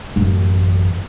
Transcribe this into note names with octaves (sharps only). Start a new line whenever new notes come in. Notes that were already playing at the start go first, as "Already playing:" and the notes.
A1 F#2